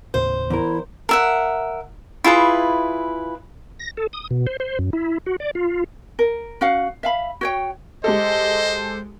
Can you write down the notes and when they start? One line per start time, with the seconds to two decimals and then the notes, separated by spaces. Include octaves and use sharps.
0.14 D#2 A2 C#3 C5
0.50 E2 E4 A#4
1.09 A#4 E5 F#5
2.24 E4 F4 G#4 B4
3.79 A#6
3.97 A4
4.13 D#6
4.31 B2
4.47 C5
4.60 C5
4.79 F#2
4.93 E4
5.26 F#4
5.40 D5
5.55 F4
6.19 A#4
6.61 C#4 F#4 F5 F#5
7.03 E5 F5 B5
7.41 F#4 C#5 G5
8.04 G#3 G4 A4 C5 D#5